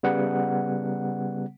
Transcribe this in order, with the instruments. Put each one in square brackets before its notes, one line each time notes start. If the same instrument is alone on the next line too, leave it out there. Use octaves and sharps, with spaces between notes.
[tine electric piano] C#3 G3 B3 F#5